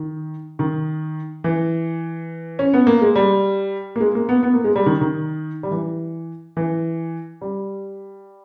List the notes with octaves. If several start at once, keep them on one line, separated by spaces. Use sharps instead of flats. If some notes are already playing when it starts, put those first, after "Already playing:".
Already playing: D#3
D#3
E3
C#4
B3
A#3
G#3
G3
A#3
G#3
A#3
B3
B3
A#3
G#3
G3
D#3
D#3
G3
E3
E3
G3